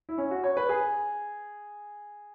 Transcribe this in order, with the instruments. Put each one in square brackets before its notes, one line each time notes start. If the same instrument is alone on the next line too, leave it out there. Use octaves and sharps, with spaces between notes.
[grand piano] E4
C#4
F#4
C#5
B4
G#4